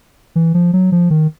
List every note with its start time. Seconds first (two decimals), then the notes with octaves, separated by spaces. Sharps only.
0.36 E3
0.54 F3
0.73 F#3
0.92 F3
1.10 D#3